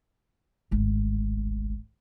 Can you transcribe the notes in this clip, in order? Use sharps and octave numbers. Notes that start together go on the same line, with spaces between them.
D1 G#1